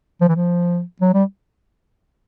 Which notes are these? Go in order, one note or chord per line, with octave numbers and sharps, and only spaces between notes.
F3
E3
F3
F#3
G3